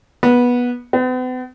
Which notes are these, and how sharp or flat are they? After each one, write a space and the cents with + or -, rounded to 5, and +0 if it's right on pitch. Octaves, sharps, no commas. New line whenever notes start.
B3 -15
B3 +45